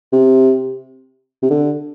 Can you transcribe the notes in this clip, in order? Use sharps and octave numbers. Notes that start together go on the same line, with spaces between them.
C3
C3
D3